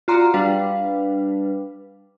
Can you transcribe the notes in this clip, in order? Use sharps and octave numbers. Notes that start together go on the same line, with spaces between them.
F4 F#4 D5 A#5 C6
G3 D4 B4 F5